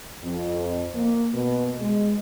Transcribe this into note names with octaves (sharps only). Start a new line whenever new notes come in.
F2
A#3
B2
G#3